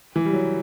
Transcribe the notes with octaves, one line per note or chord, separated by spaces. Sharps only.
E3
G3
F#3